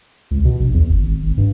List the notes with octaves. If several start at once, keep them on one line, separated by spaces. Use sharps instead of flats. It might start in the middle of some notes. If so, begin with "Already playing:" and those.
C#2
B2
A#1
E2
G1
G#1
G#1
G2